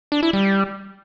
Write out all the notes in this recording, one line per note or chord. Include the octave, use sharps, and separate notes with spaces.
D4
E4
G3